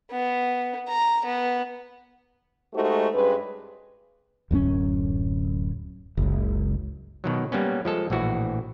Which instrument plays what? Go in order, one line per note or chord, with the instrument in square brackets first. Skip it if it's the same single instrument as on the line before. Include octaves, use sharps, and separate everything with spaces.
[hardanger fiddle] B3
A#5
B3
[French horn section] G#3 A3 D#4 F#4 G4 C5
G2 G#3 C#4 B4
[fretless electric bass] D1 F#2 C4 C#4
F#1 C#2
[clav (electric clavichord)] B2 D#3 F#3
G3 A#3 B3 C#4
F3 G#3 A4
A#1 A2 E3 F#4